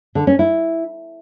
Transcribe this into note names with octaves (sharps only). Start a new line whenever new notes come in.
D3
C#4
E4